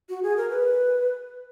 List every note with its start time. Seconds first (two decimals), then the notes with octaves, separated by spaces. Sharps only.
0.09 F#4
0.23 G#4
0.37 A#4
0.50 B4